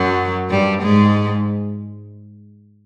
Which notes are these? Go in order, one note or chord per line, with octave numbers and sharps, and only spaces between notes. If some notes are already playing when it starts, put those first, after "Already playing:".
Already playing: F#2 F#3
G2 G3
G#2 G#3